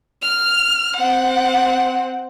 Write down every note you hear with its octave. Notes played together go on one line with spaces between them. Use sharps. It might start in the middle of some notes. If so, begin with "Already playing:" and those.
F6
C4 F#5